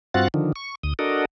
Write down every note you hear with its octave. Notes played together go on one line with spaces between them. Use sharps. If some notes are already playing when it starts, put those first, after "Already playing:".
G2 C4 F4 F#4 F#5 A6
D3 D#3 F3
C#6
D2 D#6
D4 F#4 A4 A#4 D#5